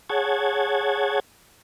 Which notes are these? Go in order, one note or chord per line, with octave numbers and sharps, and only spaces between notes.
G#4 C#5 F#5 A5 G#6